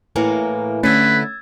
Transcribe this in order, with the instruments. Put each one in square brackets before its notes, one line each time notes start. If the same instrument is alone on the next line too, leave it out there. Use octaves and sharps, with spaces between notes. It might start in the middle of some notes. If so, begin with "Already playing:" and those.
[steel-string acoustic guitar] A2 E3 A#3 [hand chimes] E4 B4 G#5
[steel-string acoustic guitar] D3 E4 [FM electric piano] A3 C#4 [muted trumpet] B4 [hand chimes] E6 G#6 A6